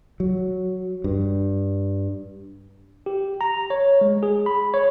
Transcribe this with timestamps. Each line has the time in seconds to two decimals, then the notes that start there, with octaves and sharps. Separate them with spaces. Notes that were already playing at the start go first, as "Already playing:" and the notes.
0.20 F#3
1.04 G2
3.06 G4
3.41 A#5
3.70 C#5
4.01 G#3
4.23 G#4
4.46 B5
4.74 C#5